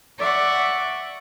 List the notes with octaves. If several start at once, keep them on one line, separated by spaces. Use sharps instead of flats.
D5 E5 F#5 C#6